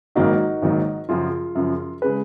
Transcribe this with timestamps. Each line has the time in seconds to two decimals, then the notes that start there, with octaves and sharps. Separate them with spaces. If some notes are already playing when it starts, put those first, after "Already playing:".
0.15 G#1 G#2 D#3 F#3 A#3 D#4 F#4
0.62 G#1 G#2 D#3 F#3 A#3
1.09 F#2 C#3 F3 F4 G#4
1.55 F#2 C#3 F3
2.02 C#3 G#3 G#4 B4